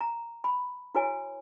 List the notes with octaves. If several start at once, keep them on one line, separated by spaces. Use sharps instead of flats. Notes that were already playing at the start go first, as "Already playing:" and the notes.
A#5
B5
E4 F#4 B4 C#5 G#5